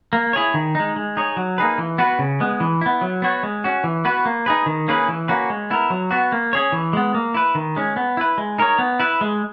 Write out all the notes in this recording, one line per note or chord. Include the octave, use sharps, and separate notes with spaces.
A#3
E4 G#4 C#5
D#3
G#3 D#4
G#3
D#4 G#4 C#5
F#3
A#3 D#4 G#4 B4
E3
B3 F#4 B4
C#3
G#3 B3
E3
B3 E4
F#3
B3 F#4 C#5
G#3
C#4 F#4
E3
B3 F#4 B4
A#3
D#4 G#4 B4
D#3
A#3 C#4 G#4 B4
E3
A#3 C#4 F#4 B4
G#3
B3 E4 A#4
F#3
B3 F#4
A#3
C#4 G#4 C#5
E3
G#3 B3
A#3
E4 B4
D#3
G#3 C#4
B3
E4 B4
G#3
D#4 A#4 C#5
B3
E4 B4
G#3